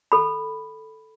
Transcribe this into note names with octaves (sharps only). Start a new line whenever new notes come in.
A4 B5